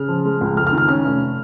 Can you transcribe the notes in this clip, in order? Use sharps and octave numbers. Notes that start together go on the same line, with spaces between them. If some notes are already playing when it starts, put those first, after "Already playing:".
Already playing: C#3 F6
F3
G#3
C#2
F2 F6
F6
D#3
F6
C#4 F6
F1